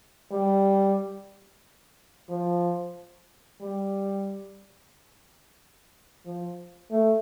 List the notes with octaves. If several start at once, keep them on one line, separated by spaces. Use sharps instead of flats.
G3
F3
G3
F3
A3